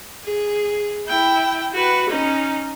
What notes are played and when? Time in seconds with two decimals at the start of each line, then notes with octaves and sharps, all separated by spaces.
0.24 G#4
1.08 E4 G5
1.73 F#4 B4
2.09 C#4 D#4